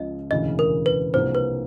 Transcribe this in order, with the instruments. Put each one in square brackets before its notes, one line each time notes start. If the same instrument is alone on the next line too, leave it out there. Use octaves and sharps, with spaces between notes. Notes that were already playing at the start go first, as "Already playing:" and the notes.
Already playing: [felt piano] C#2 C#3 F3 [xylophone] D#5
[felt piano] E1 D2 C#3 E3 [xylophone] D#5
[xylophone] A#4
B4
[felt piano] C2 C3 F3 A#3 D4 [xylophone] C5
[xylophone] B4